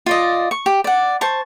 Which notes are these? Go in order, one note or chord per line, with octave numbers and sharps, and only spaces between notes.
F4 D5 D#5
C#6
G4
D5 F#5
C5 A5 C#6